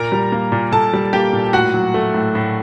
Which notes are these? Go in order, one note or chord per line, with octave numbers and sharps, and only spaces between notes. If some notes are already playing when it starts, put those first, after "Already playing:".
Already playing: A#2 A#4 A#5
G3
A#3
A#2
A#2 A4 A5
G3
A#3 G4 G5
A#2
A2 F#4 F#5
F#3
A3
A2
A2